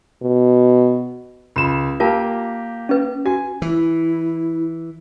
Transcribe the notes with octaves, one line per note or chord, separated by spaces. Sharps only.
B2
C#2 B5 E7
A#3 F4 G4 A#4 A5
C#4 B4
F#4 G#5
E3 E4